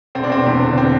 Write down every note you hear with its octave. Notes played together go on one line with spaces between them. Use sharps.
E1 C4
D4
E1 C4
E2 C4
D3
C4